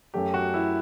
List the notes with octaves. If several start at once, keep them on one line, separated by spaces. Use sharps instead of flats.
F#2 F#3 A3 G4
F#4
E4